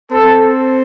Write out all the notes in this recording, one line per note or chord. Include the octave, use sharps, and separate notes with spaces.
C4 A4